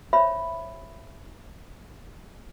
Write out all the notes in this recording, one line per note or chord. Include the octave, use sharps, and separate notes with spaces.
C5 C#5 E5 B5